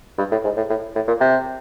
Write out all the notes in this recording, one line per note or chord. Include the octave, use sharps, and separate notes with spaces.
G2
A2
G#2
A2
A2
A2
A#2
C3